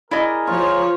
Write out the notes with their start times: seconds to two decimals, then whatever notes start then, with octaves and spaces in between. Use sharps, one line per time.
0.11 E4 G#4 A#4 D5 D#5
0.47 F3 F4 C#5